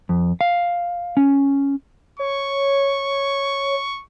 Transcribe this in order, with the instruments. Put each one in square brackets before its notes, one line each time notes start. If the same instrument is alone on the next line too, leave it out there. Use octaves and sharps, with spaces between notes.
[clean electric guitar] F2
F5
C#4
[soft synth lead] C#5 [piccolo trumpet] C#6